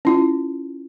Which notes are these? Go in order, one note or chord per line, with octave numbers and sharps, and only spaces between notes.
C#4 E4 F4